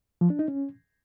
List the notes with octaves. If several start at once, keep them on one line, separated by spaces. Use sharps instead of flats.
F3
D4
D#4
C#4